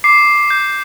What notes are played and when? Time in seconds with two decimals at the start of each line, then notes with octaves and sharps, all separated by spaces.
0.04 D6 C7
0.50 G6